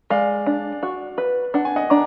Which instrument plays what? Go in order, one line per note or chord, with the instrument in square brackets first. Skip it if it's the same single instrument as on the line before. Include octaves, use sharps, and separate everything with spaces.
[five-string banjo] G#3 [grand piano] D5 F5
[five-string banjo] D4
F#4
B4
[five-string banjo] D4 [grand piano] F#5
[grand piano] G#5
D#5 F#5
[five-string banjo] D4 [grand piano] A#5 D6